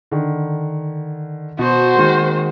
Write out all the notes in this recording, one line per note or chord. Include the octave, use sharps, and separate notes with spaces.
D3 D#3
B2 F#4 C5
D#3 G#3 A#3